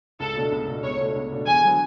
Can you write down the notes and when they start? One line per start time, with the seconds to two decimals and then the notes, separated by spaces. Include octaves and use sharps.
0.20 C#2 A4
0.36 B2 A3 D4
0.52 C#2
0.68 B2 A3 D4
0.83 C#2 C#5
0.99 B2 A3 D4
1.16 C#2
1.32 B2 A3 D4
1.47 E2 G#5
1.63 D3 F#3 B3